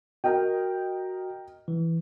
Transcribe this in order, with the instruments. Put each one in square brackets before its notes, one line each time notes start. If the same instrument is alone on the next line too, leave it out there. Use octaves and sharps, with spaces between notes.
[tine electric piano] F#4 [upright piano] A#4 D#5 G5
[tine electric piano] E3